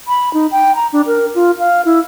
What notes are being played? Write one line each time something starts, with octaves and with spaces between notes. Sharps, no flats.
B5
D#4
G5
A#5
D4
A#4
F4
F5
E4